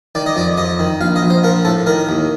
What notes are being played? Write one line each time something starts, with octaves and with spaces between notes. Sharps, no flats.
D#3 D5
D#5
F2 D5
F2 D#5
D#3
A#1 F5
D#5
A#1
C5
F3 A#4
A2 A4
D#3 A#4
D#2